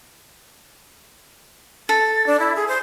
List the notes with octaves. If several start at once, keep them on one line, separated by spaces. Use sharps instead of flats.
A4 A6
D4
E4
G#4
C5